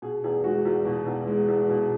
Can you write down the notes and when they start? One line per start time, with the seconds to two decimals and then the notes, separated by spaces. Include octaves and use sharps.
0.02 B2 G#4
0.24 E2 G#4
0.44 G#3 F#4
0.65 E2
0.85 B2
1.06 E2
1.27 G#3
1.48 E2
1.70 B2